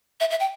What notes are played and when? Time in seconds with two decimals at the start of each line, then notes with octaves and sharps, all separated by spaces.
0.20 E5
0.30 E5
0.40 G5